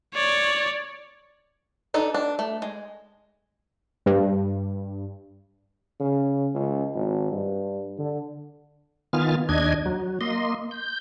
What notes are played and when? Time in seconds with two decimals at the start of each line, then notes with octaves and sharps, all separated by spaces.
0.14 C#5 D5
1.94 D4 D#4 A4
2.14 D4
2.39 A3
2.62 G#3
4.06 G2
6.00 C#3
6.55 C#2
6.95 G#1
7.32 G2
7.99 D3
9.13 D#3 B3 F4 G#5 F6 A6
9.49 D#2 D4 D#5 G#6
9.86 F#3
10.21 A#3 D#5 C6
10.71 G6